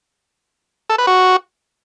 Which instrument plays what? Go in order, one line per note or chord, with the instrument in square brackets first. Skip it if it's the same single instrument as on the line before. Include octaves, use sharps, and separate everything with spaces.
[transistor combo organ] A4
B4
F#4